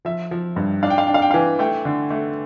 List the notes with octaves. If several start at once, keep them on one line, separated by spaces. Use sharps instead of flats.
F3 E5
F3
G2
D4 F5
G5
F5
D4 G5
F5
G5
E3 F5
A3 G5
D3
A3